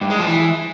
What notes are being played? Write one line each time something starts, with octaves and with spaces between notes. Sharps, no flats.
G2
G#3
F3
E3